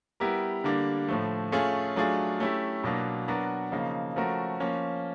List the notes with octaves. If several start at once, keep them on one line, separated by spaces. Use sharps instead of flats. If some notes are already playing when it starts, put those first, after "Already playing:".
G3 B3 E4 G4 A#4
D3 G3 A#3 D4
A2 F3 A3
A3 C#4 F4 G#4
F#3 A3 D4 F4 G#4
A3 C#4 E4 G4
B2 F#3 A#3 D4
F#3 B3 D4 F#4 A#4
C#3 F3 A#3 D#4
F3 A3 C#4 F#4 A#4
F3 A#3 C#4